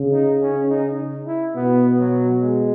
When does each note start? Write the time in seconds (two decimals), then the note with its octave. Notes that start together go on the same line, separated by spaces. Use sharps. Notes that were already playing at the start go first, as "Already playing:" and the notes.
Already playing: C#3
0.12 D#4
0.41 C#4
0.69 D#4
1.27 E4
1.55 B2 B3
1.98 F#3
2.41 G#3